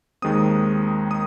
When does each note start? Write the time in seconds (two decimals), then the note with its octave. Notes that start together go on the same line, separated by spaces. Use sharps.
0.22 D#2 D#3 G#3 C4 D#6
1.11 D#6